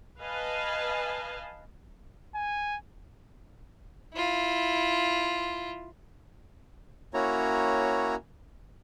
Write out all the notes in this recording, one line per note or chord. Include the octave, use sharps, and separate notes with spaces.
B4 D#5 F5 G#5 A5
G#5
E4 F4
A#3 C#4 E4 F#4 C#5 A#5